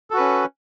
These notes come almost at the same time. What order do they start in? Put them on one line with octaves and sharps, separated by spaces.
A4 F#4 B4 C#4